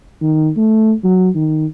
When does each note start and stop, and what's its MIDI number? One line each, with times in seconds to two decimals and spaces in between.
0.22 0.50 51
0.57 0.93 57
1.04 1.29 54
1.35 1.66 51